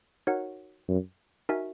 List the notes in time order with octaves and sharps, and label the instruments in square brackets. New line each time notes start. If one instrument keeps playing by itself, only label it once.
[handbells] D#4 F#4 A#4 C#5 F#5
[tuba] F#2
[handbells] D#4 F#4 A#4 E5 G#5